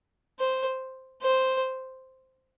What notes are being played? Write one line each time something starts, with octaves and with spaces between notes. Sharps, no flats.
C5
C5